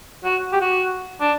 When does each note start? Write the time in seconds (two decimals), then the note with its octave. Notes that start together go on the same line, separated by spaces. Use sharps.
0.25 F#4
0.53 G4
0.61 F#4
1.21 D4